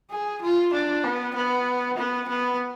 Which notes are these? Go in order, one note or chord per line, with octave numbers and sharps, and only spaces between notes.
G#4
F4
D4
B3
B3
B3
B3